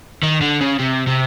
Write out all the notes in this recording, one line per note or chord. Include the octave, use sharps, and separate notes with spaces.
D#3
D3
C#3
C3
C3